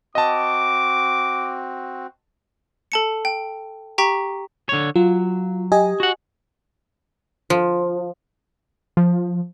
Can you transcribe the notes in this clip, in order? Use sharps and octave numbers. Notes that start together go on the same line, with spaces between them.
C4 F#4 D#5 A5 D6
A4 A5 C#7
G5
G4 G5 A#5 C#6 B6
D3 C#5
F#3 F4
G4 D#5 G#5
F#4 F#5
F3
F3